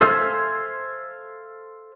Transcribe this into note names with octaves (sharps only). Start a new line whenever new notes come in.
A4 C5 E5 F5 G#5